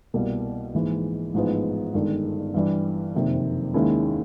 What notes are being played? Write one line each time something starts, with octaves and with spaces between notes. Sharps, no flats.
C2 B2 G3 A#3
A#1 G#2 E3 G#3
A1 G#2 F3 G#3 B3
G1 G2 D#3 G#3
G2 E3 G3
F#1 F2 C3 D#3
D#2 D#3 G#3 C#4 E4